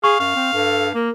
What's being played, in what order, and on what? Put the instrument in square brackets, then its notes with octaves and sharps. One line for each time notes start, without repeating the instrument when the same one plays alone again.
[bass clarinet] G#4 [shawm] F5 [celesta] C#6
[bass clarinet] F#2 [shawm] F5
[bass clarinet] C4
[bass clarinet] G2 [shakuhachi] A4
[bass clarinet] A#3 [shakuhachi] A#4